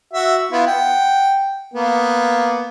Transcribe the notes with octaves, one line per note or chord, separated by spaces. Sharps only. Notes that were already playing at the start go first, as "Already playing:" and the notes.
F#4 E5
B3 E4 F4
F#5 G5
A#3 B3